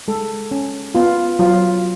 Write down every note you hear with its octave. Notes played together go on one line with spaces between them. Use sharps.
G#3 A4
C#4
B3 F4
F#3 F4